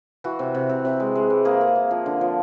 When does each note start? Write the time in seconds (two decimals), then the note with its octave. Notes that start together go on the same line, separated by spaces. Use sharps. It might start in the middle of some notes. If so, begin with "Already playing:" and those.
0.24 E3 F#4
0.39 C3
0.55 C3
0.69 C3
0.85 C3
1.00 G#3
1.15 G#3
1.30 E3
1.45 A#3 G#4
1.61 A#3
1.76 A#3
1.91 F3
2.06 D3
2.21 F3